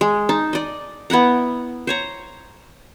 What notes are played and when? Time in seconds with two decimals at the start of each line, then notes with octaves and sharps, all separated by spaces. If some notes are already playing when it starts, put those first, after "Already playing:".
0.01 G#3
0.29 D#4 A5
0.53 D5 D#5
1.10 B3 E4 F#5 A#5
1.87 C5 C#5 A#5